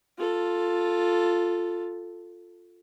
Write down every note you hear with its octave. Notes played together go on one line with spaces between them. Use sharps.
F4 A4